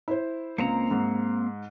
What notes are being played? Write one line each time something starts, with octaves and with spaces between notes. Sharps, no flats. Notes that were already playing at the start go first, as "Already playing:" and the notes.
E4 C5
C#2 A#3 C4 A#5 C#7
G#2